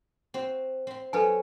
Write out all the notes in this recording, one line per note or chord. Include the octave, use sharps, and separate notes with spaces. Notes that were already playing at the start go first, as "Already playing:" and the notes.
C4 F#4 C5
C4 C6
F#3 C4 A4 B4 C#5 G#5